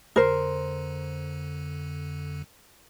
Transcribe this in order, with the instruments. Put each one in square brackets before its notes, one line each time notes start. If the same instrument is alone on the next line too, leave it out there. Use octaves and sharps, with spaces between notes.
[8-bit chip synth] F2 D3 [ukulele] A#4 C5